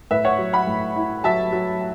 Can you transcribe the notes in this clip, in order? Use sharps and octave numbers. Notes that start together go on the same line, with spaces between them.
A2 B4 E5
C#5 F#5
F#3
F#5 B5
A2
E4
F#3 E5 A5
F#3